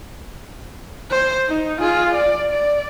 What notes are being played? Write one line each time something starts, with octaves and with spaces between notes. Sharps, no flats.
C5
D#4
F4 G#4
D5
D5